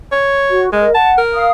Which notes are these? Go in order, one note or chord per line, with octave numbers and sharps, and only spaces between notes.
C#5
F#4
G#3 A#4 D#5
F#5 A5
A#4
F5 D#6